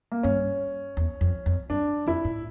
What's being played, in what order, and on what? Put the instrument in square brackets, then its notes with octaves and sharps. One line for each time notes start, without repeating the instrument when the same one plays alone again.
[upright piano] A#3
[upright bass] G2 [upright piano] C#4
[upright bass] E2
F2
F2
[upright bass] G2 [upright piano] D4
[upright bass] F2 [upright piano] E4
[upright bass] A2